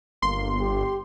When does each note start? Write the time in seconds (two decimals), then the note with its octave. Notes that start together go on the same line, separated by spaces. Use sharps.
0.22 G1 A#3 C6
0.60 G4